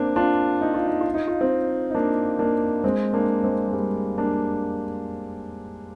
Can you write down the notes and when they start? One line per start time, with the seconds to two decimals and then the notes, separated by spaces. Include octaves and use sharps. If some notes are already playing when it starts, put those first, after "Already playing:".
Already playing: A#3 C4 D4
0.16 D4 F4
0.61 D#4
0.74 F4
0.87 D#4
1.01 F4
1.14 D#4
1.28 F4
1.41 C4 D#4
1.90 D#4
1.95 A#3 D4
2.39 A#3 D4
2.84 G#3 C4
3.13 A#3 D4
3.44 G#3 C4
3.68 G#3
3.73 G3 A#3
4.18 A#3 D4